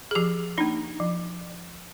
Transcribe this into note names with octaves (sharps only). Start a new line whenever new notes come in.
G#4
F3 G4
A#3 D4 D#4
F3